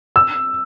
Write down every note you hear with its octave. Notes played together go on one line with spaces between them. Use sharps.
E6